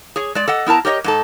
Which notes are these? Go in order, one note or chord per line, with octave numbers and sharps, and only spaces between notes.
G#4 C#5
G#3 D5
A4 D#5 F#5
B3 E4 A#4 A5 A#5
G4 A#4 C#5 D#5
G#2 D#4 A4